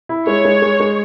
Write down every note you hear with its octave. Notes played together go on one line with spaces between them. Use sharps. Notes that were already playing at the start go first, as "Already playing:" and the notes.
E4
G#3 C#5
G#3
G#3
G#3